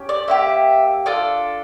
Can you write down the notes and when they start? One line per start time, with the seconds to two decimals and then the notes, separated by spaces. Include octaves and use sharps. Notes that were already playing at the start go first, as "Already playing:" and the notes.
Already playing: C#4 G4
0.09 D5
0.28 A#3 E4 G4 E5
1.06 D4 F4 A4